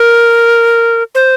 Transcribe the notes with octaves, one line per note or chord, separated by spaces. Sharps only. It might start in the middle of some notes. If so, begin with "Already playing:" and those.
Already playing: A#4
C5